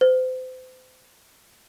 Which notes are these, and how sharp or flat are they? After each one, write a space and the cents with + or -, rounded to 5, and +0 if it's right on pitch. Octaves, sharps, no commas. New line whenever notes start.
C5 -35